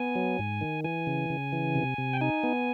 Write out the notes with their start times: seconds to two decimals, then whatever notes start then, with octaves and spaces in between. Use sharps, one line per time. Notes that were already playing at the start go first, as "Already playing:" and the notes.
Already playing: B3 G#5
0.15 F#3
0.39 G#2
0.61 D#3
0.84 E3 G#5
1.07 C#3
1.30 C#3
1.53 E3
1.75 C3
1.98 C3
2.13 G5
2.21 D#4 G#5
2.43 B3